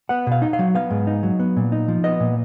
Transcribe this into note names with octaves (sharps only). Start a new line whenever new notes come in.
B3 F#5
B2 F5
D#4
F5
F#3
B3 F5
G#2
D#4
F#3
B3
A#2
D#4
F3
B3 D#5
A#2